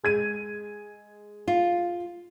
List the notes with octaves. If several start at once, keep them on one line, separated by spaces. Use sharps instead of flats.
G#3 G#6 D#7
F4